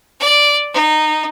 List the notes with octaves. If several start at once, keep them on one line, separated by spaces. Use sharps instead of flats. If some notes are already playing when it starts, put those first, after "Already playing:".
D5
D#4